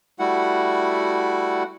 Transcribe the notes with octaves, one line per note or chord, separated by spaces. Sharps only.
G3 A3 E4 F#4 F#5